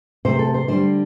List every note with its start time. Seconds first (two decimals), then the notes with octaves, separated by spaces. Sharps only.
0.25 C3 A3 C5
0.39 A4
0.54 C5
0.68 D3 G3 C5